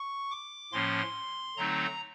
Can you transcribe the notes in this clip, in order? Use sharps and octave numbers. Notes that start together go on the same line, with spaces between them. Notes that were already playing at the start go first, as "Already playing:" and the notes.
Already playing: C#6
D6
A2 F3 A#3 C#4 C6
D3 F#3 A3 C4 D#4 A#5